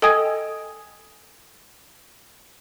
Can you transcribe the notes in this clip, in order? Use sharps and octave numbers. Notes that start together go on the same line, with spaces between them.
A4 D#5 G5 G#5 D#6 G#6